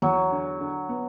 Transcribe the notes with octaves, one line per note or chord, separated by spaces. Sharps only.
E2 F#3
D3
D3
B3